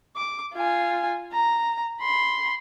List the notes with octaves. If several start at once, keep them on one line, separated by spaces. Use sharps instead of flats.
D6
F4 G#5
A#5
B5 C6